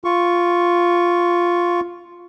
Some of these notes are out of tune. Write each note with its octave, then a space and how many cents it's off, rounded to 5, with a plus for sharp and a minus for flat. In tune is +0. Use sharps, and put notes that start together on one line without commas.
F4 +0 C#6 +0